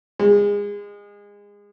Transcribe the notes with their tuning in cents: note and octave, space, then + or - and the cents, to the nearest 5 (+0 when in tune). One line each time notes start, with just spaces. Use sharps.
G#3 -25